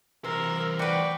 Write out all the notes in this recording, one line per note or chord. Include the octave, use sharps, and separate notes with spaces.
C3 E3 A#4 C5 E6
F#4 B4 D5 G5